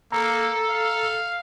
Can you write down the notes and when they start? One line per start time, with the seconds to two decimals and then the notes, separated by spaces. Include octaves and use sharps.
0.12 A#3 A4 A#5
0.69 F5